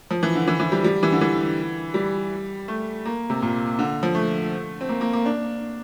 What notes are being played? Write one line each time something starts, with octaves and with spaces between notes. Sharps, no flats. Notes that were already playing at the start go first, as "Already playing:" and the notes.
F3
E3
D3
E3
E3
G3
G3
E3
D3
E3
G3
A3
A#3
C3
A#2
D3
F3
A3
C4
A#3
A#3
A#3
D4